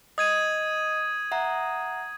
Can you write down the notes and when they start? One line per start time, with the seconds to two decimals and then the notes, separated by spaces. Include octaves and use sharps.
0.18 D#5 D#6 G#6 D#7
1.32 E5 F#5 A#5